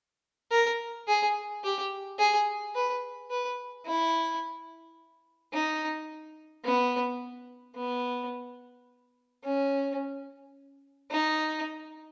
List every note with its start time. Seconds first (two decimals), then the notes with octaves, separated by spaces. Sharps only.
0.51 A#4
1.08 G#4
1.64 G4
2.19 G#4
2.75 B4
3.30 B4
3.86 E4
5.53 D#4
6.64 B3
7.76 B3
9.44 C#4
11.10 D#4